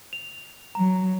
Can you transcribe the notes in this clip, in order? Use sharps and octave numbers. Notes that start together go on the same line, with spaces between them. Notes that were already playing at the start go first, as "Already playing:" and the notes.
F7
F#3 A#5